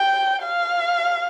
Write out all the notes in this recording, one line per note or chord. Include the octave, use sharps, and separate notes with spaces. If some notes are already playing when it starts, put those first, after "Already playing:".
Already playing: G5
F5